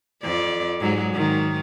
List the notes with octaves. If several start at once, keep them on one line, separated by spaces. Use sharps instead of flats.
F2 D5
G#2 F#3 G#3
G#2 D#3